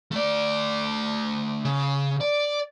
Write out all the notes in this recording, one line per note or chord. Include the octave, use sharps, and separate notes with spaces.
A3 D5
C#3
D5